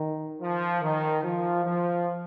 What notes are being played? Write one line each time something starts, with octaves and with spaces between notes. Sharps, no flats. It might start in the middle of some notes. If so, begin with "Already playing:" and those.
Already playing: D#3
F3
D#3
F3
F3